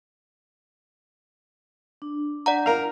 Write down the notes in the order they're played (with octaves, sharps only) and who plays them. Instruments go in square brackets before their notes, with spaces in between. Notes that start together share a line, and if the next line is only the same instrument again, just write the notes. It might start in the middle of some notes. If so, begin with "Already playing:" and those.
[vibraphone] D4
[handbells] D5 F#5 A#5
[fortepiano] A#4 F5